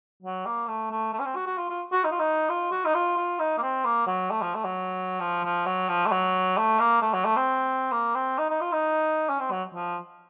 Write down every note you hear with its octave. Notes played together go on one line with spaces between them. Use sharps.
F#3
A#3
A3
A3
A3
C#4
C4
F#4
F#4
F4
F4
F#4
D#4
F4
D#4
F4
F#4
D#4
F4
F4
D#4
A#3
C4
A#3
F#3
A3
F3
A3
F#3
F3
F3
F#3
F3
A3
F#3
A3
A#3
A3
F#3
A3
C4
A#3
C4
D#4
D#4
F4
D#4
C#4
C4
F#3
F3